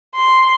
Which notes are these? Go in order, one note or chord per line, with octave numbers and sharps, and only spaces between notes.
C6